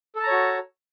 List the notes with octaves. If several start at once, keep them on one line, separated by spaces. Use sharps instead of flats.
F#4 A4 C#5 A5 A#5